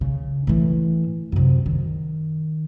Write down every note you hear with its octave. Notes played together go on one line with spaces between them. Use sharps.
C#3
A2 E3
F#2 C3
D#3